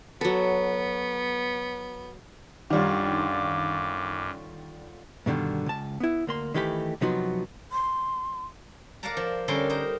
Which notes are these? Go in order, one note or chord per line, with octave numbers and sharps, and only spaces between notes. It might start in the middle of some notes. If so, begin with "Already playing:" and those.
F#3 B3 A4
F#2 D3 D#3 G3 F4 C#5 D6
G2 B2 D3 D#3 G3
C#2 A5
B3 E4
D2 A#3 C6
D#3 E3 A3 G4 G#4 B5
C3 F3 F#3 B3 D#4 F#4
C6
A#4 D5 F5 F#5 A5 A#5
F3
D3 G3 C#4 A#4 A5 C6
D#4 A#4 C5